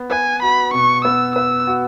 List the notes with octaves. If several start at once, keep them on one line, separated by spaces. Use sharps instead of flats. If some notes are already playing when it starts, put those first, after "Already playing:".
Already playing: B3
B4 G#5
F#4 B5
B2 C#6
B3 E6
B4 E6
F#4